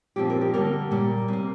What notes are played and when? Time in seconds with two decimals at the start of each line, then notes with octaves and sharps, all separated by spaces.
0.16 A#2 F3 C4 G4
0.30 A#4
0.41 G4
0.53 D3 G3 A#3 A#4
0.91 A#2 G3 A#3
1.28 C3 A#3